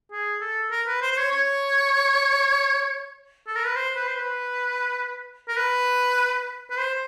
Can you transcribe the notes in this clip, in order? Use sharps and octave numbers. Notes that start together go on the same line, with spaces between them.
G#4
A4
A#4
B4
C5
C5
C#5
C#5
A4
A#4
B4
C5
B4
C5
B4
A#4
B4
B4
C5